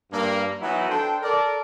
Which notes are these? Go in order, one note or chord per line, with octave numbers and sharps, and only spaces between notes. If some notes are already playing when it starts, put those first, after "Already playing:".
G2 A#3
E3 F#3 B3 D#4 E4 F#4
D4 A4 C5 G5
A4 A#4 D5